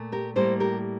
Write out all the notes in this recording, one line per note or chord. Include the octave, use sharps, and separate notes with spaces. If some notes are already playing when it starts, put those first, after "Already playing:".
Already playing: A#2 A3
G4 A#4
A2 G3 A#3 A4 C5
G4 A#4